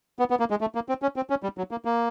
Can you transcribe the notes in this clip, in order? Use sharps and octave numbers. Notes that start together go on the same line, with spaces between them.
B3
B3
A#3
G#3
A3
A#3
C4
C#4
C4
C#4
G3
F#3
A#3
A#3